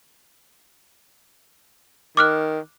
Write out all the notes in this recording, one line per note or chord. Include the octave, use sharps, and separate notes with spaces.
D#3 D6 F6 F#6